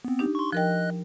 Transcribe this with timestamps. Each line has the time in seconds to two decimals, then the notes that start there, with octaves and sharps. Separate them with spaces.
0.05 B3 C4
0.19 D4 D#4 G4
0.35 C6 C#6
0.53 F3 A#4 D#5 G5 F#6